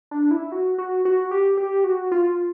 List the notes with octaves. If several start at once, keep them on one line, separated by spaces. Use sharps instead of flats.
D4
E4
F#4
F#4
F#4
G4
G4
F#4
F4